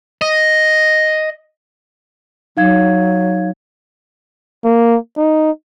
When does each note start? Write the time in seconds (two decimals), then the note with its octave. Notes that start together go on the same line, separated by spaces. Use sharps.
0.22 D#5
2.57 F#3 D#4 F5 G#6
4.64 A#3
5.17 D#4